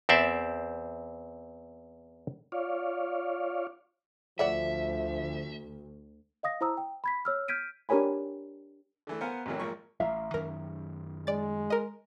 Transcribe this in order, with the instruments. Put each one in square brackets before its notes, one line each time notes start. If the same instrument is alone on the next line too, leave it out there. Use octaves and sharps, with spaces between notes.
[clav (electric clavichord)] E2 C4 C5 D5 E5
[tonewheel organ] F4 C#5 D5 F5
[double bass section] D2 [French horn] F3 [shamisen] A3 D5 F#5 [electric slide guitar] E5
[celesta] D#5 F5 D#6 A#6
E4 C5 A#5 D#6 E6
G5
B5 G#6 B6
C#5 E6 F6
F6 G6 G#6 B6 D7 D#7
[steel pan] D4 G4 A#4 C#5 G#5 B5
[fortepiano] D3 E3 A3
B3 A#4 C5 F5 F#5 G#5
A1 F#2 C3 D#3 E3 F#3
G#1 F3 A#3 C#6
[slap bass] A1 [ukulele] E5 F5 A#5
[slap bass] F#2 D#3 C#4 [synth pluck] A#4
[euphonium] G#3 [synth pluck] D5 A6
[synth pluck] A#4 D#5